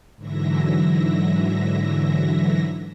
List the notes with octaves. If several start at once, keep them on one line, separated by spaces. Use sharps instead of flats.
G#2 D3 E3 F#3 E5 A#6